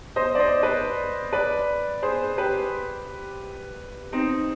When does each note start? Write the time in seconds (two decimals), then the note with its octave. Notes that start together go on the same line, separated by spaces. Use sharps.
0.16 C5 D#5
0.35 D5
0.39 C5 D#5
0.63 B4 D5
1.33 B4 D5
2.02 G#4 C5
2.38 G4 B4
4.12 C4 D#4